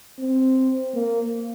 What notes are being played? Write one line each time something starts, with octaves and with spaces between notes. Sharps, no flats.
C4
A#3